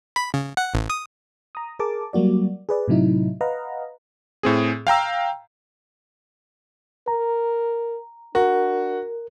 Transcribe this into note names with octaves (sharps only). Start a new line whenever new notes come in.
B5
C#3
F#5
A1
D#6
A#5 D#6
G#4 A#4 A5 D6
F#3 G3 A#3 F#4 D5
G#4 B4 D5
A2 C3 F#3 D#4 E4
B4 D#5 F5 F#5 A#5
A2 C4 G#4
F5 G5 A#5 E6
A#4 A#5
D4 F#4 A#4